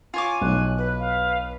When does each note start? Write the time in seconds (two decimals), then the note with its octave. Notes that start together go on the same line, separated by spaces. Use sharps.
0.14 F4 C#5 G#5 D6
0.41 B1 F#6
0.78 B4
0.99 F5